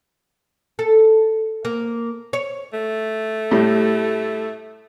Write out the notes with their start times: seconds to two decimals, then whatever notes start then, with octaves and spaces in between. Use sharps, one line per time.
0.79 A4
1.65 A#3
2.33 C#5
2.73 A3
3.51 A2 G3